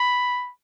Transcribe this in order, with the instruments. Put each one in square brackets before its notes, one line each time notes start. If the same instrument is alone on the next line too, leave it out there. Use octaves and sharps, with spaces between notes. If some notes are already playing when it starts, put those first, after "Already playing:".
Already playing: [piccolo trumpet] B5